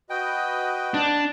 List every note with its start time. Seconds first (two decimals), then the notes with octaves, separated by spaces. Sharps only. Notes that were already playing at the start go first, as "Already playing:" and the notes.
0.10 F#4 B4 D#5 G5
0.94 D4